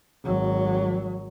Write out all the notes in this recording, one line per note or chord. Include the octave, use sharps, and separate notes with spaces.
G#1 F#3